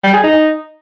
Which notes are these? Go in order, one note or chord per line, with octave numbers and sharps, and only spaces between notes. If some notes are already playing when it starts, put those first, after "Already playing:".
G3
G#4
D#4